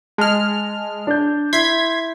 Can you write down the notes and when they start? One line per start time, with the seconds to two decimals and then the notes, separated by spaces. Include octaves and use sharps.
0.18 G#3 A5 F6
1.07 D4 G6
1.53 E4 C6 G#6 B6